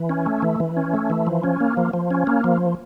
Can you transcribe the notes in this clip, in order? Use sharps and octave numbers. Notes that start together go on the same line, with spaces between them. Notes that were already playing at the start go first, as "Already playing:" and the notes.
Already playing: E3
C#4
A3
E3
E3
C#4
A3
E3
F3
C#4
A#3
F3
F3
C#4
A#3
F3